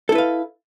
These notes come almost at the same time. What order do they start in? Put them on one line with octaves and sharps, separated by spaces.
A4 E4 B4 F5